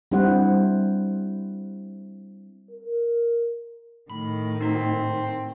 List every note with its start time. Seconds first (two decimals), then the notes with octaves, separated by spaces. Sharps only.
0.12 G3 C4 D4 E4 C5 F#5
2.71 A#4
4.10 A2 D#3 B5
4.61 C4 D#4 F#4